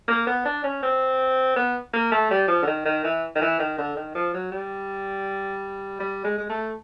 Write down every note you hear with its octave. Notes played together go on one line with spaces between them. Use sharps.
A#3
B3
D4
C#4
C4
B3
A#3
A3
G3
F3
D3
D#3
D#3
E3
D#3
E3
D#3
D3
D#3
F3
F#3
G3
G3
G#3
G#3
A3